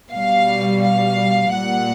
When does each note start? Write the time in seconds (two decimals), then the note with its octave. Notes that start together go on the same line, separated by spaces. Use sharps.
0.11 B2 G3 F5
0.82 F5
1.52 A#2 G3 F#5